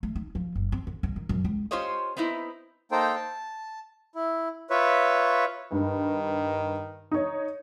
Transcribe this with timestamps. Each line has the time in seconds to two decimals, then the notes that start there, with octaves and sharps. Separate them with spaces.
0.03 A3
0.15 D#4
0.35 F3
0.55 F#1
0.72 C4
0.87 D3
1.03 C2
1.16 D#3
1.29 F#2
1.44 C#2
1.71 C#4 F4 G4 C5 C#5 D#5
2.17 B3 C4 D#4 E4
2.91 A#3 D#4 A4 C5 G5
3.15 A5
4.15 E4
4.70 F4 B4 C#5 E5
5.72 G2 D#3
7.11 D#4 C#5